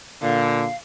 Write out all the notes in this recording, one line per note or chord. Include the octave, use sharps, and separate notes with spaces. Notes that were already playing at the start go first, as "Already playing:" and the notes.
A#2 D3 F5